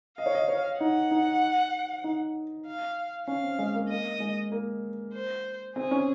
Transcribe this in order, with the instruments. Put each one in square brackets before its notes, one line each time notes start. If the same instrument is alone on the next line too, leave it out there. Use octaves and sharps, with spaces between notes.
[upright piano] D#5 [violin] F5
[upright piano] C#5
D#5
C#5
[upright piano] D#4 [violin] F#5
[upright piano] D#4
D#4
[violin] F5
[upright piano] C#4 [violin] F5
[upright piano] C4
G#3
A#3
[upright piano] A#3 [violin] D#5
[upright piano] G#3
A#3
[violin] C5
[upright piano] C4 [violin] G#4
[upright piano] C#4